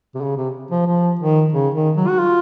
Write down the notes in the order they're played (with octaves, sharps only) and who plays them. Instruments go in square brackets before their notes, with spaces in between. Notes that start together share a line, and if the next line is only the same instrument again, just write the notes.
[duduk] C3
C#3
C3
F3
F3
D#3
C#3
D#3
F#3
F#4
F4